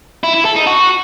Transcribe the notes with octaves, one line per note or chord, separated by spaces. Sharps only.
E4
E4
A4
D#4
F#4